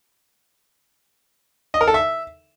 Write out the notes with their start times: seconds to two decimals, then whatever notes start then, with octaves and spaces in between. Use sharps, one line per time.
1.74 D#5
1.81 A#4
1.87 A4
1.94 E5